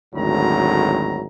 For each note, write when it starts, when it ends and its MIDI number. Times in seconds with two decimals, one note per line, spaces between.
0.15 1.26 32
0.15 1.26 38
0.15 1.26 45
0.15 1.26 54
0.15 1.26 82